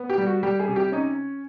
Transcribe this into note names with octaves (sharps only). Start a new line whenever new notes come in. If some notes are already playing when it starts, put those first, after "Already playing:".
Already playing: B3
G4
G3
F#4
G3 G4
G#4
C3
G4
C#4 D#4